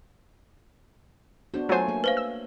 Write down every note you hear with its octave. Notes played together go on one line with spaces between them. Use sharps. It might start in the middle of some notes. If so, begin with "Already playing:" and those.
B3 D4 F#4 C5
F#3 A3 F4 C5 C#5 G#5
A#3 G#5
B4 C5 F5
E6